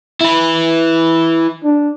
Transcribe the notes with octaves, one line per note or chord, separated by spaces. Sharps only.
E4 B4
D4